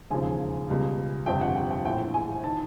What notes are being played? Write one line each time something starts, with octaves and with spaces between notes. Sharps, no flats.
E1 D#2 C#3 F3 G#5
C#2 B2 G3
G1 F2 C3 F3 G5
F#5
G5
G5
A#1 A2 E3 G5
G#5
D#3 A5